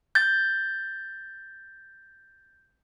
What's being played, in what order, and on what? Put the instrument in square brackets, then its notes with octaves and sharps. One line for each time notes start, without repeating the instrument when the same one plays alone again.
[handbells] G6 A6